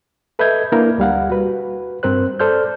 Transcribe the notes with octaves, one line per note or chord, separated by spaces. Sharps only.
A4 B4 D#5 E5 G6 G#6
A#3 D4 E4 A#4 B4
D2 G3 F5 F#5
F#4 B4
G2 C4 A#4 C5 F#6
A4 C5 D5 F6 G6